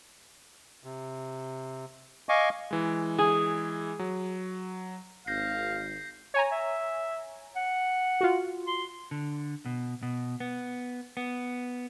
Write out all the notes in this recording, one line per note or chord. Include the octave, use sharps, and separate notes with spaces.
C3
D#5 F5 G#5 C#6 D6
E3 G#3
G#4
F#3
G#1 F5 G6 A#6 C7
C#5 G#5 A#5
E5
F#5
F4 F#4
C6
D3
B2
B2
B3
B3